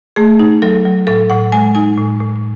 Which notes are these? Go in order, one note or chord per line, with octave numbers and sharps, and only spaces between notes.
A3 G#4
D#4
F#3 A4
F#3
A2 A4
A2 F#5
G#3 G#5
D#4 G#5
A2
A2